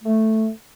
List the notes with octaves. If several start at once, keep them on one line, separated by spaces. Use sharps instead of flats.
A3